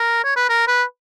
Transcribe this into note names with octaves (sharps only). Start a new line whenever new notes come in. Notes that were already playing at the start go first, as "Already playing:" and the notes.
Already playing: A#4
C#5
B4
A#4
B4